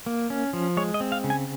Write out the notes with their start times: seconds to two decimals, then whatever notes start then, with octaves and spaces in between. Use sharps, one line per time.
0.06 A#3
0.30 C#4
0.53 F3
0.77 G#3 C#5
0.94 D#5
1.00 C4
1.12 F5
1.24 C#3
1.30 G#5